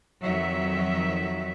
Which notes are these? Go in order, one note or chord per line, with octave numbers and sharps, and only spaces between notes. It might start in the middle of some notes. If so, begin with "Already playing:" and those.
F2 D#3 F#3 E5